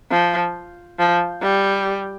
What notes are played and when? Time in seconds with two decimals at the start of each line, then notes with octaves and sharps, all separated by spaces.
0.11 F3
0.99 F3
1.42 G3